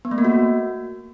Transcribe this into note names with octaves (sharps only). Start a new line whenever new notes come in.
B3
A3
A#3
F#4